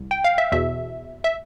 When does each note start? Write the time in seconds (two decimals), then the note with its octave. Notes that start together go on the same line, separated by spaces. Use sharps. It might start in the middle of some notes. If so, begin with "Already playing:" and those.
Already playing: C2
0.11 G5
0.24 F5
0.38 E5
0.52 E2 B2 E5
1.24 E5